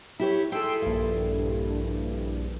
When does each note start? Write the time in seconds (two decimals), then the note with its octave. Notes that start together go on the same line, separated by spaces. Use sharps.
0.20 E4 G4 C#5
0.52 E4 G#4 A4 G5 C6 E6
0.82 A#1 G2